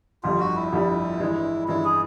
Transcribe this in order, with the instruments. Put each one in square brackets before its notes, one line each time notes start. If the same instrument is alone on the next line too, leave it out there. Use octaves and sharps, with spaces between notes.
[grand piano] G1 F2 D3 G3 [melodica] F4
[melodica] F#4
E4
[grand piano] G1 F2 D3 G3
G2 E3 G#3
[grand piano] G2 E3 G#3 [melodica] E4
[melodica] G#4